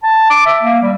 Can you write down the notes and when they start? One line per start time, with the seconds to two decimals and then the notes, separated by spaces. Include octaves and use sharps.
0.03 A5
0.30 D6
0.46 E5
0.63 A#3
0.82 G3